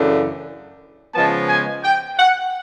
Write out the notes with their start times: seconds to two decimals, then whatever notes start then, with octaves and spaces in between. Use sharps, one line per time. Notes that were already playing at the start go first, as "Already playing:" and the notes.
Already playing: F#2 C#3 E3 A3 D4
1.14 C#3 F3 G#3 B3 A5
1.49 G#5
1.84 G5
2.18 F#5